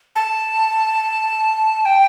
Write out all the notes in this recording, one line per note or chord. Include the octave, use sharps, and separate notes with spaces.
A5
G5